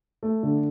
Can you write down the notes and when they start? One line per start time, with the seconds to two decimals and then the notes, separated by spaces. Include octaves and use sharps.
0.23 A3
0.43 D3